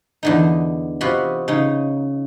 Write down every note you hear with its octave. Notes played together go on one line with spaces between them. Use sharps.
E2 D3 D#4
C3 F4 F#4 D#5 B5
C#3 D#4